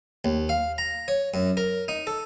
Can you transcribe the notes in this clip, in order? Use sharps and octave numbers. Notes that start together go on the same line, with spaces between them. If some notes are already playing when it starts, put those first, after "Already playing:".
D#2
F5
A#5
C#5
F#2
A#4
D#4
A4